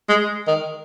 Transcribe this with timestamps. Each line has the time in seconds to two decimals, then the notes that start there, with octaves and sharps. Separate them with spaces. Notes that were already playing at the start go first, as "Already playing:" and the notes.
0.09 G#3
0.47 D#3